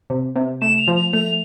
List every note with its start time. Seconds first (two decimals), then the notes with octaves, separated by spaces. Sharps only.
0.10 C3
0.36 C3
0.62 A3 E7
0.78 F7
0.88 F3
0.96 F7
1.13 A3 F7